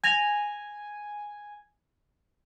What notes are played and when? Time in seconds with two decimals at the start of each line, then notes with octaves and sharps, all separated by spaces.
0.04 G#5 G#6 A#6 F7